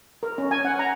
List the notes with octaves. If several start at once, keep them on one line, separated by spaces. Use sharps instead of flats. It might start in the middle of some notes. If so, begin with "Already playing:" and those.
A#4
C#4
G#5
F#5
A#5